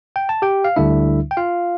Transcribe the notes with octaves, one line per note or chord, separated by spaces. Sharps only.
G5
A5
G4 G5
F5
D2 D3 G3 D4 E4 E5
G5
F4 F5